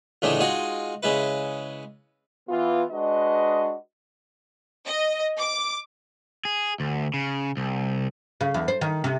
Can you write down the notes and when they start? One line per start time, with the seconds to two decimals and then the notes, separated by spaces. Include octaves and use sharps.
0.22 C#2 A2 D3 E3 G#3 A3
0.40 G#3 D#4 F4 F#4 G#4
1.03 C#3 G#3 E4 B4
2.49 E3 B3 F4
2.91 G#3 D4 F#4 B4 D#5
4.87 D#5
5.38 D6
6.45 G#4
6.80 D2
7.14 C#3
7.57 C2
8.41 C#3
8.54 E2
8.68 C5
8.81 D#3
9.04 C3